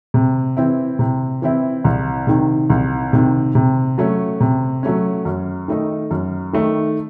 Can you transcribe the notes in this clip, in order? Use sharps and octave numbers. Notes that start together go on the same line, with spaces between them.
C3
E3 C4 E4
C3
E3 C4 E4
C2
C3 D#3
C2
C3 D#3
C3
F#3 A3 C#4
C3
F#3 A3 C#4
F#2
D#3 A3 D#4
F#2
D#3 A3 D#4